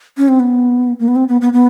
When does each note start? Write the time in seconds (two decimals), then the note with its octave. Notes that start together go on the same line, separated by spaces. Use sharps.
0.18 C#4
0.28 C4
0.40 B3
1.00 A#3
1.08 B3
1.16 C4
1.28 B3
1.41 B3
1.53 B3